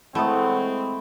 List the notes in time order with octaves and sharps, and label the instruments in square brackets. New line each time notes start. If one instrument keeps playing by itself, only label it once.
[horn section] E3 C#5 F#5 [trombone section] G#3 C4 [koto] A3 [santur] E4 D#6